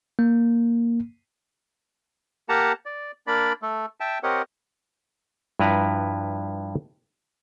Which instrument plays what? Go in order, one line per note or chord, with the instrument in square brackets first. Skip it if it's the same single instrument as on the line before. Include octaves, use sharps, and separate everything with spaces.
[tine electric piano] A#3
[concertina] A#3 G4 F#5 A5 A#5
D5
A#3 D4 D5 B5
A3 A4
E5 G5 A5
C4 G4 A#4 C#5 D#5 F#5
[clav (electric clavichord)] G2 F3 E4 B4 A#5